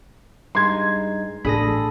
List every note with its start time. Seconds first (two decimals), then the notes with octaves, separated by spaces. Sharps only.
0.55 G2 G#3 D#4 C6 G#6
1.45 A1 D4 G#4 A4 B5 D#6 A#6